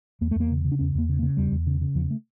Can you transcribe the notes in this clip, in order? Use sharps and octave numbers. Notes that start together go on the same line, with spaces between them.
E2 A#3
A3
E2 A#3
C#3
C#3
D4
E2 C#4
E2 A#3
C#3
A#3
C#3
E2 G3
E2
C#3
C#3
E2 F3
A3